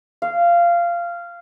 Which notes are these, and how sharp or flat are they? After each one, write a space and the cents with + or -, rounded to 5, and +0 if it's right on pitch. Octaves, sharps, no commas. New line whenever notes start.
F5 -15